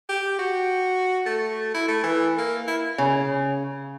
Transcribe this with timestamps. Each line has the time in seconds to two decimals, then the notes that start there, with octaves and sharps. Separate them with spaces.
0.09 G4
0.39 F#4
1.26 A3
1.74 E4
1.89 A3
2.04 E3
2.38 A#3
2.68 E4
2.98 C#3